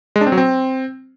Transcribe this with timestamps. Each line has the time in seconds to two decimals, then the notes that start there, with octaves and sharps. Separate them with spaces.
0.16 G#3
0.21 D4
0.27 C4
0.32 F#3
0.38 C4